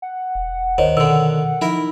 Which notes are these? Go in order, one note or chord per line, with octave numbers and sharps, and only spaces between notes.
F#5
E1
D2 D#3 C5 C#5 D#5
B2 D3 D#3 E6
F3 D#4 E4 A#4